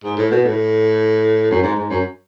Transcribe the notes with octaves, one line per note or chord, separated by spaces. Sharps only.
G#2
A2
B2
A2
F#2
G#2
G#2
F#2